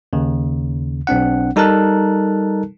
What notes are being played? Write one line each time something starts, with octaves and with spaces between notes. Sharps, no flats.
D#2 C#3
B1 C4 D4 F#5
G3 D#4 A4 A#4 A5 F#6